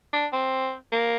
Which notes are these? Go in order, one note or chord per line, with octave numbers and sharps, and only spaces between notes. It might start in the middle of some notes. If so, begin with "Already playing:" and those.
D4
C4
A#3